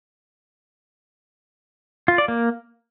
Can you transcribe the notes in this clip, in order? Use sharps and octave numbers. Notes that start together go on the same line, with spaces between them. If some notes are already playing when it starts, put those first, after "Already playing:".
F4
D5
A#3